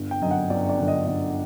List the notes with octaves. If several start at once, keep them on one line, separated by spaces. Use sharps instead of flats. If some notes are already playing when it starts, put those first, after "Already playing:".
Already playing: G1
G5
F#2 D3 D#5
F#5
G1 D5
D5
F#2 D3
D#5
G1 D#5